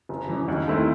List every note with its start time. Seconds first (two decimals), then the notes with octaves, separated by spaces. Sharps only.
0.09 F#1
0.29 F#2 E3
0.48 D#2
0.68 D#3 A3 C4 E4